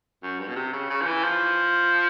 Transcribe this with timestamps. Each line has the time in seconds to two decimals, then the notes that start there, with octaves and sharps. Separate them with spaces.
0.23 F#2
0.39 G2
0.48 B2
0.56 C3
0.73 C#3
0.90 C#3
1.01 F3
1.06 E3
1.24 F3